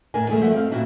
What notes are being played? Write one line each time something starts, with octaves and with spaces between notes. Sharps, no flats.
A2 D4 A#4 G#5
E2 G#3 A3 G#4
G2 F3 A3 E5 F#5
C4 F5
A#2 D#3 E4 F#4 E5 A5